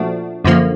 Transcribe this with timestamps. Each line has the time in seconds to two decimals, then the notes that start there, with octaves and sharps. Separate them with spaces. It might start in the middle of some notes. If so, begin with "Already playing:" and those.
Already playing: A#2 F3 A3 D4 F#4
0.44 F#2 D3 F3 A#3